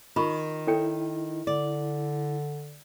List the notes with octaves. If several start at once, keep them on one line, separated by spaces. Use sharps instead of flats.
D#3 F4 B5 C#6
E4 A4 C#5 G5
D3 D5